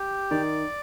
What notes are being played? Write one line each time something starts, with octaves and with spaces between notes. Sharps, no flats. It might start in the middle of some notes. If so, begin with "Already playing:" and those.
Already playing: G4
D#3 D5